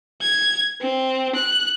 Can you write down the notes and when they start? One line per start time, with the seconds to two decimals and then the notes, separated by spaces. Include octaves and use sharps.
0.21 G#6
0.81 C4
1.35 F#6